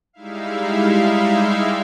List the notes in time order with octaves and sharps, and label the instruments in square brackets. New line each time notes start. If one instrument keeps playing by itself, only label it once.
[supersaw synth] G3 G#3 D#4 E4 E5 F5